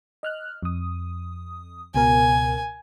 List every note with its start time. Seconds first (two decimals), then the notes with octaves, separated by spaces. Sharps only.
0.23 D#5 F6 F#6
0.63 F2 D#6
1.95 C#2 B2 A#4 G#5